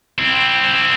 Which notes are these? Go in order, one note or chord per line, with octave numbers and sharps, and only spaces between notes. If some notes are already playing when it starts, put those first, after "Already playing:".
C4 E4